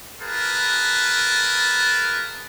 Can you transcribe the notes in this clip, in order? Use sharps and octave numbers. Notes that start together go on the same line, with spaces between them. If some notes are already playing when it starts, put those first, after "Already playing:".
F4 G#4 A#4 B4 A5